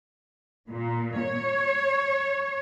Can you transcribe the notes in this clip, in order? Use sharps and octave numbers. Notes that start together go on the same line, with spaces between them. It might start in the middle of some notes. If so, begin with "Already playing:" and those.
A#2
C#5